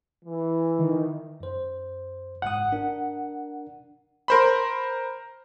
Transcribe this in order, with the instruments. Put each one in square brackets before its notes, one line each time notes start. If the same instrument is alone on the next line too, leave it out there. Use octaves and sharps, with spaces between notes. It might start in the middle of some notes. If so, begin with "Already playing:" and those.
[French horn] E3
[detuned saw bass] D#3
[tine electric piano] F#2 C5
[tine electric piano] G#1 G#2 D#6 [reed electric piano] F#5
[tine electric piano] D4 A#4
[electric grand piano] A#4 C5 B5